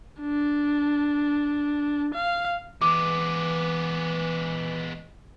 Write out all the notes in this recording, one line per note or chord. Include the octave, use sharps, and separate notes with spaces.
D4
F5
E3 G#3 B3 D6